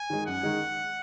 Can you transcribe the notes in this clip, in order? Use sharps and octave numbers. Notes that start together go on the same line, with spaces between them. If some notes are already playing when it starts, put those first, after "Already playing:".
Already playing: G#5
D#3 G#3
F#2 F#5
D#3 G#3